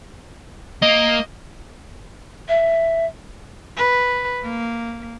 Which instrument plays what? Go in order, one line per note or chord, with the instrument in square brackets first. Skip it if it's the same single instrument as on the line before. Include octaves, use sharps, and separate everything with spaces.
[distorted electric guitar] A#3 [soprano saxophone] D#5
[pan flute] E5
[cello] B4
A#3